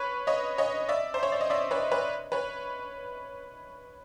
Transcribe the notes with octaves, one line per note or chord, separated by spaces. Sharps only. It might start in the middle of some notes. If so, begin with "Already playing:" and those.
Already playing: B4 C#5
C#5 D#5
C#5 D#5
D5 E5
C5
C#5
D5
D#5
D5 E5
B4 C#5
B4 C#5
B4 C#5